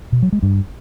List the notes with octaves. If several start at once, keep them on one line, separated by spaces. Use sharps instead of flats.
B2
F#3
G#3
G2